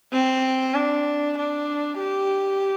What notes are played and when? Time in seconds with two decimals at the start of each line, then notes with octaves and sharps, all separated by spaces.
0.13 C4
0.75 D4
1.38 D4
1.99 G4